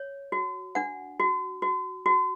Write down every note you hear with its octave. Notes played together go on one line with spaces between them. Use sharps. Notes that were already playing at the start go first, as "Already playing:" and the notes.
Already playing: C#5
F#4
D4 F#5
F#4
F#4
F#4